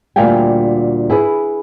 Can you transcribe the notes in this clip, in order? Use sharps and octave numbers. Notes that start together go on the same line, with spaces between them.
D2 A#2 G3 F5 G5 G#5
E4 G#4 B4